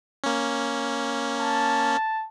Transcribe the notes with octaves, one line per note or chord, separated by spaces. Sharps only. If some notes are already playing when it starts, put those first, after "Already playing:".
A#3 C#4
A5